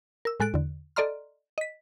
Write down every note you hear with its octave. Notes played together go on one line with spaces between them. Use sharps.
A#4 E6
A2 G#3 A4 F#6 D7
E2 D3
A4 D5 D#5 A#5 C6 F6
D#5 B6